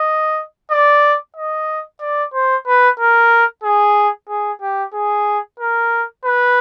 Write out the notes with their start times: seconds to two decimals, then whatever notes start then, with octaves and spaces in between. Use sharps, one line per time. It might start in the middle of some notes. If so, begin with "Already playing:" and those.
Already playing: D#5
0.71 D5
1.36 D#5
2.01 D5
2.34 C5
2.67 B4
3.00 A#4
3.64 G#4
4.29 G#4
4.62 G4
4.93 G#4
5.60 A#4
6.25 B4